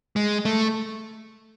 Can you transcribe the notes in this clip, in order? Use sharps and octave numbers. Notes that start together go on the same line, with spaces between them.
G#3
A3